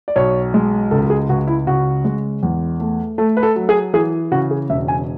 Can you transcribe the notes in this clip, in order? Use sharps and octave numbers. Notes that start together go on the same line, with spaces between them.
D5
B1 C#5
G#3
C#2 A4
G#4
C#2 F#4
E4
C#3 F#4
G#3
E2
A3
A3 A4
B4
A4
F#3
G#4
E3 G#4
C#3 F#4
G#4
E1 E5
G#5